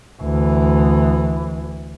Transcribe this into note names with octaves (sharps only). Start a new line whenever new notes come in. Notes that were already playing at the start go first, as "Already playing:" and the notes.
D2 E3